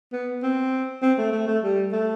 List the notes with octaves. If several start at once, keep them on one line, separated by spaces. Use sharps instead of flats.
B3
C4
C4
A3
A3
A3
G3
A3